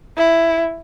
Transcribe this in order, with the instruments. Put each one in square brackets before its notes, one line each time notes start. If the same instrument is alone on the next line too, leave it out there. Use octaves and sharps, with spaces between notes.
[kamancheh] E4